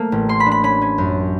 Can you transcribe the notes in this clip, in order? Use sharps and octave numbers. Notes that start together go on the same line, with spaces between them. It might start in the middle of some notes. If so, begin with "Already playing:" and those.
Already playing: A3 A#3
A1
A#3 C6
B5
D4
B5
C#4 B5
C#4
F#2